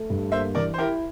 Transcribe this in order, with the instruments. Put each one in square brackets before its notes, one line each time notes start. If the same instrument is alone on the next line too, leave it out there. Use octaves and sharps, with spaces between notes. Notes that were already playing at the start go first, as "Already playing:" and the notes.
Already playing: [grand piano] A3
G2
[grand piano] A#3 [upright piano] C5 E5
[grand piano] E3 [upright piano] A#4 D5
[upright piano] C5
[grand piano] E4 [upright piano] G4 A#4